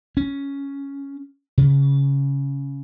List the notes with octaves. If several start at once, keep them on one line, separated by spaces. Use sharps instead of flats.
C#4
C#3